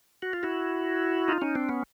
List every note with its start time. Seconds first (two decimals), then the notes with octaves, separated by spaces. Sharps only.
0.22 F#4
0.33 F4
0.43 E4 F#4
1.28 D#4 F4
1.42 C#4 D#4
1.55 C4 D4
1.69 B3 C#4